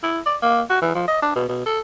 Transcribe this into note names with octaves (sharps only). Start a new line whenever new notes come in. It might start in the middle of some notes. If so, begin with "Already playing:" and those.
E4
D5
A#3
F#4
E3
F3
D#5
D4
B2
B2
A4